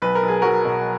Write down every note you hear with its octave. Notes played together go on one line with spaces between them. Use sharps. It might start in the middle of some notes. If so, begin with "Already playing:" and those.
B1 B4
A#4
B1
G#4
F#3 F#4 A#4
B2